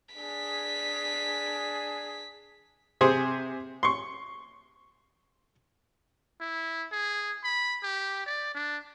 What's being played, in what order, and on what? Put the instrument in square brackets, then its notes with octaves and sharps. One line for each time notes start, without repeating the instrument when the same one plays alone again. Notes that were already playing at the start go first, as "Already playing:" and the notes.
[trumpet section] D4 G#4 [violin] B6
[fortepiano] C3 G#4 C5 G#5
C6 C#6
[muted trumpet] E4
G#4
B5
G4
D5
D4